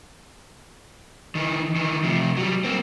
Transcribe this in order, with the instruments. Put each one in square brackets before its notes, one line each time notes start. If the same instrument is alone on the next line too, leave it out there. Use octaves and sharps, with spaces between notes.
[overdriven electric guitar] D#3 E3
D#3 E3
C3 F3
F#3 G3
A#3 C4